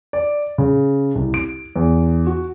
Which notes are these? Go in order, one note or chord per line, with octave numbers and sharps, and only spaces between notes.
D5
C#3
C2
D7
E2
F#4